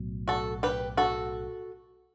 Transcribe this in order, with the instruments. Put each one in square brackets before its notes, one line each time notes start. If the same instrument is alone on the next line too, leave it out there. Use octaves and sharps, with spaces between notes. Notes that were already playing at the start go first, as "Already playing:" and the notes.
Already playing: [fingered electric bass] B1 A2 F#3 B3
[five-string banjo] F#4 A4
G4 B4
F#4 A4